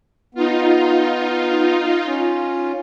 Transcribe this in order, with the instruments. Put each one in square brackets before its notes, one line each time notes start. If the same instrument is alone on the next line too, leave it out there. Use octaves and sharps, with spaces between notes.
[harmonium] B3 [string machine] D#4 F4
[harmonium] C#4 F4